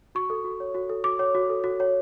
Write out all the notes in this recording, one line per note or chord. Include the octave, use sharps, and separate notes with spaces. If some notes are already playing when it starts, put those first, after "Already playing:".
F#4 C#6
A4
F#4
C#5
F#4
A4
F#4 D6
C#5
F#4
A4
F#4
C#5